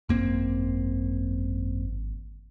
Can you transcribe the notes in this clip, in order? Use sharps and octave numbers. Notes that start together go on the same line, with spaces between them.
G#1 F#2 A#3 C4